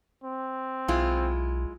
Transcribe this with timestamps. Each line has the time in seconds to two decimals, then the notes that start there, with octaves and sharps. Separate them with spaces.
0.24 C4
0.88 B1 G#3 E4 F4